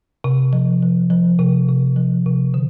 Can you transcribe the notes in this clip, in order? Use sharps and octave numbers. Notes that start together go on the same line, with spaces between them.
C3
F3
F3
F3
C3
C3
F3
C3
D3